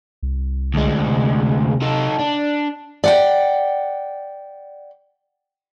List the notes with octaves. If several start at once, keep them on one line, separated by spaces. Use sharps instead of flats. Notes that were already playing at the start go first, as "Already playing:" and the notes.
C2
D2 G#3
C3
D#4 A4
D4
D5 F#5 G5